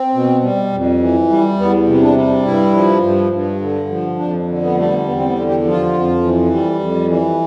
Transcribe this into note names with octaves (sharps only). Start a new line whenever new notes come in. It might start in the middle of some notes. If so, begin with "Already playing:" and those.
Already playing: C4
B2
G3
F2
E3
G3
E2 B3
C3
D4
G3
G2 E4
F3
G2
G2
D3
F3
F2 D4
D3
B3
G3 A3
B3
E2 B3
C4
B3
D3
G4
F3
F4
F2
E3
G3
F2
E3